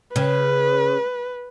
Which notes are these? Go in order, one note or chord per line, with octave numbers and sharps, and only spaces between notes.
C#3 B4